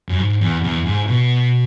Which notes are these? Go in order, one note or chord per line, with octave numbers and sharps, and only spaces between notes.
F#2
G#2
E2
E2
G#2
B2